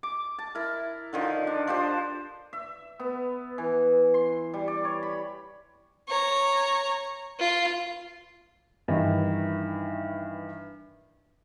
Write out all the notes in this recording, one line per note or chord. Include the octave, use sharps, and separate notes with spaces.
D6
A5
E4 A#4
D3 D#3 F3
D4
F3 D4 G4 C5
E5
B3
E3
C6
G3
D5
C#5
B5
C#5 A#5
F4
G2 D#3 E3